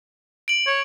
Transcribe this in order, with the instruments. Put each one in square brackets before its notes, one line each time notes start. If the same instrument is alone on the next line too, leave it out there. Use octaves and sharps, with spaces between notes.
[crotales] D7 F#7
[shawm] C#5